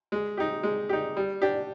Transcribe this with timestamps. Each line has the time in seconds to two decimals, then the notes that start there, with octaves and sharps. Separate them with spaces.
0.12 G#3
0.37 D#4 G4
0.63 G#3
0.89 D#4 G4
1.17 G3
1.42 D4 G4